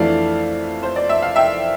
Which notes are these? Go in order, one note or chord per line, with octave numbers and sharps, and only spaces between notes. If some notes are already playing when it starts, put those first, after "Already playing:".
Already playing: F2 E3 A3 D4 D5 F5
C5
D5
E5
F5
E5 G5